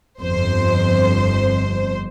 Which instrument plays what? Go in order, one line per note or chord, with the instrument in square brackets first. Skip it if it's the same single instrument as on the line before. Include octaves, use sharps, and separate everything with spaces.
[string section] G1 F2 C5